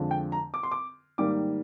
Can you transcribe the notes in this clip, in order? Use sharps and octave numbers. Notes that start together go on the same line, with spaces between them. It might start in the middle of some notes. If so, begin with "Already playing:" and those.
Already playing: F2 D3 F3 G#3
G5
A#5
D6
C6
D6
G#2 D#3 G3 A#3 D6